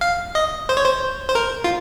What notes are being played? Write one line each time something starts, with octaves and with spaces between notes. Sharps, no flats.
F5
D#5
C5
C#5
C5
C5
A#4
F4